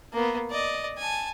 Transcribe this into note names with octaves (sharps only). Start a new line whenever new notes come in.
A#3 B3
D5 D#5
G#5 A5